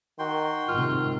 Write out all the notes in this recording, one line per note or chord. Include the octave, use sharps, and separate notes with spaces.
D#3 F#4 G5 C6
G#1 G#2 C3 D#3 F4